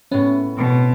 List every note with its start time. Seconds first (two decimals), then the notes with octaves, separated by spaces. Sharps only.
0.11 A2 B3 C#4
0.57 B2 C4